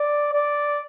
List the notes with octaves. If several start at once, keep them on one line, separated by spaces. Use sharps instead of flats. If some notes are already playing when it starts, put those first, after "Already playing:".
Already playing: D5
D5